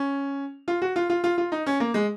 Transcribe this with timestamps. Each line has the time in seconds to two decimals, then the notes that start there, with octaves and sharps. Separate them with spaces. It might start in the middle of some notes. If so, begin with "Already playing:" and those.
Already playing: C#4
0.68 F4
0.82 F#4
0.96 F4
1.10 F4
1.24 F4
1.38 F4
1.52 D#4
1.66 C#4
1.80 A#3
1.94 G#3